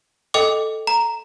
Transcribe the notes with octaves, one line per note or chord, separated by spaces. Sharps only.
A4 D#5 G5 D6
A#5